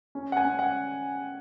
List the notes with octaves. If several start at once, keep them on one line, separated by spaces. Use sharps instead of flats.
C#4
F#5
G#5
C#4
F#5